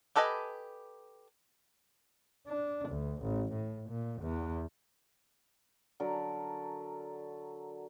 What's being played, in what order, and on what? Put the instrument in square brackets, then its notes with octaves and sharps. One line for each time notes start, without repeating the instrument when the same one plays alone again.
[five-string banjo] G4 A4 B4 D#5 G#5
[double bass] D4
D2
A1
A2
A#2
E2
[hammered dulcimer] D3 F#3 A4 A#4